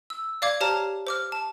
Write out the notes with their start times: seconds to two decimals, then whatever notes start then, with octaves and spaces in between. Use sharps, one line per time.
0.10 E6
0.42 D5 F5 D6 G#6
0.61 G4 C5 C#5 A5 A#5 F6
1.07 C5 D6 F6
1.32 A5